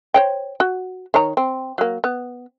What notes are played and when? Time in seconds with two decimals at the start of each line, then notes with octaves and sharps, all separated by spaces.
0.14 C5 C#5 G5
0.60 F#4
1.14 D#3 C#5 A#5
1.37 C4
1.78 F#3 A#3
2.04 B3